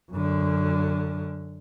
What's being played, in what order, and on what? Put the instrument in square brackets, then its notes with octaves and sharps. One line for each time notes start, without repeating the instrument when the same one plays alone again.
[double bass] F#2 D3